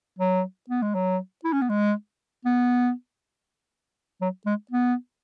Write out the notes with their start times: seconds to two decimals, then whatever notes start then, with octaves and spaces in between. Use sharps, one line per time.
0.19 F#3
0.70 B3
0.82 G#3
0.95 F#3
1.44 E4
1.53 C#4
1.61 B3
1.69 G#3
2.45 B3
4.21 F#3
4.46 G#3
4.71 B3